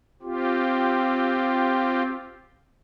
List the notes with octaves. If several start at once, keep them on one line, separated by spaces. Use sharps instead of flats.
C4 F4 G4